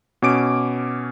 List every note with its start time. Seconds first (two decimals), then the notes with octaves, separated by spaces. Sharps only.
0.22 B2 C#4 D6 D7